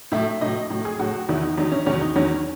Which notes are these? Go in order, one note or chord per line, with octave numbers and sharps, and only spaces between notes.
A2 F#3 E5
A2 F#3 D#5
A2 F#3
G#4
A2 F#3 F#4
E2 D#3 F#3 E4
D#4
E2 D#3 F#3 D#4
C#4
E2 D#3 F#3 C#4
D#4
E2 D#3 F#3 C#4